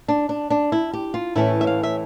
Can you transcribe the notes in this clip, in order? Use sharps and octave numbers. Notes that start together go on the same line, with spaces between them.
D4
D4
D4
E4
G4
F4
A2 E3 A3 C#4 E4
E5
F5
E5